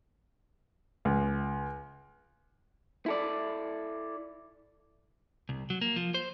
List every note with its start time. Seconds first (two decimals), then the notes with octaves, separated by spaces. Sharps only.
1.05 C#2
3.06 E4 A4 D5
5.49 C2
5.70 F#3
5.81 A#3
5.96 F3
6.14 C5